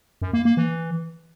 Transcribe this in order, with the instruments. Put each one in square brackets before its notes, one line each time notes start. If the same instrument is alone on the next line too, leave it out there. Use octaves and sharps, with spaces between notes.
[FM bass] F#2
A#3
A#3
E3